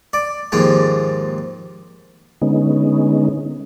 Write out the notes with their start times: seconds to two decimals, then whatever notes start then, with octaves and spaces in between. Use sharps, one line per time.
0.13 D5
0.52 D#2 G#2 F3 G3
2.41 D3 G#3 B3 C#4 D#4